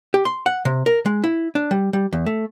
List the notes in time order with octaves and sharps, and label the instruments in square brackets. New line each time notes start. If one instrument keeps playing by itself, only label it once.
[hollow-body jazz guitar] G4
C6
F#5
C3
A#4
G#3
E4
D4
G3
G3
E2
A3